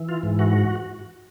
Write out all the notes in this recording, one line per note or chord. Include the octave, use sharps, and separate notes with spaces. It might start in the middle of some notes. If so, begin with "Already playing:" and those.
Already playing: E3
F4
G#2
F#4